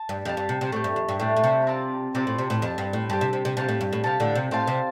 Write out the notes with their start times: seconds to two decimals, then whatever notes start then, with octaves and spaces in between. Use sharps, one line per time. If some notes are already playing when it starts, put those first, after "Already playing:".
Already playing: A5
0.09 G2
0.25 F2 G4 F5 A5
0.37 G2
0.49 C3
0.61 C3
0.72 A2 A3 D4 G4
0.84 G2
0.96 F2
1.08 G2
1.20 A2 A3 D4 G4
1.37 A2
1.44 C3
1.67 C4 F4 D5 A5
2.14 C3 C4 F4 D5 A5
2.27 A2
2.38 C3
2.50 A2
2.62 F2 G4 C5 A5
2.78 G2
2.93 A2
3.10 G2 G4 C5 A5
3.21 C3
3.33 C3
3.45 C3
3.57 C3 G4 F5 A5
3.69 A2
3.81 G2
3.93 A2
4.04 C3 G4 F5 A5
4.20 A2 D3
4.35 C3
4.51 A2 G4 C5 F5 A5
4.67 C3